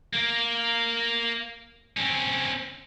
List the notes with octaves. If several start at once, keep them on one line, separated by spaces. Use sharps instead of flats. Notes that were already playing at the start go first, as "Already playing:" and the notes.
A#3
C4 C#4